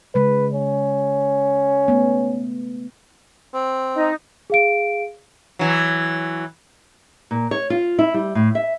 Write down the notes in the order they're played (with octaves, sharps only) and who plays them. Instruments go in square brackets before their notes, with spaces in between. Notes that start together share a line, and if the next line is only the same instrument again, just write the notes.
[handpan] C#3 G#3 [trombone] B4
[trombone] C#4
[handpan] A3 B3
[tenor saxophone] C4
[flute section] D#4
[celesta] G#4 F5 D7
[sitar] E3 F#3
[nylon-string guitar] A#2
C#5
F4
E4
G3
A2
E5